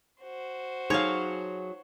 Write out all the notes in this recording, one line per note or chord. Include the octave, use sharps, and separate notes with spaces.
F#4 C5
F#3 D#4 G#4 C#5 F5 A5 C6